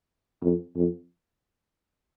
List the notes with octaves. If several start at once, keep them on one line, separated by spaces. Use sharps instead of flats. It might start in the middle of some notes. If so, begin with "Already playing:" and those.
F2
F2